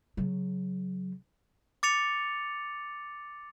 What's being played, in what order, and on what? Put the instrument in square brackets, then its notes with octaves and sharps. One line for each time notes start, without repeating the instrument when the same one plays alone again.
[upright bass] C#3 F#3
[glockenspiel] D6 A6 C#7 F7